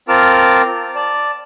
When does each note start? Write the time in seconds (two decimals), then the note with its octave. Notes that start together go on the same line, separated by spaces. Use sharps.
0.09 C4 F4 A#4 A5 D6 F6
0.96 D5 A5